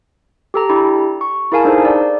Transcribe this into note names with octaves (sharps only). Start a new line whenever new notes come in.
G4 A4 A#5
D4 E4 G4 B5
C#6
E4 G#4 A#4 F5 G#5 A5
D4 D#4 G#4 A4 C5
D5